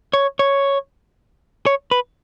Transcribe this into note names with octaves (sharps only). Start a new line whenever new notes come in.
C#5
C#5
C#5
B4